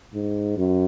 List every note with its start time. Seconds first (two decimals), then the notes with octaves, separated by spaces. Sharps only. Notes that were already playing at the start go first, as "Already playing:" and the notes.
0.14 G#2
0.57 F#2